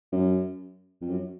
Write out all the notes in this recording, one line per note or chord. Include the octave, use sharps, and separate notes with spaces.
F#2
F2
F#2